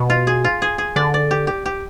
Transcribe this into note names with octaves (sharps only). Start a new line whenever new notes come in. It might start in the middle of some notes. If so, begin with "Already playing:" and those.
Already playing: B2
F4
G#4
F4
G#4
G#4
D3 D5
D5
G4
G4
G4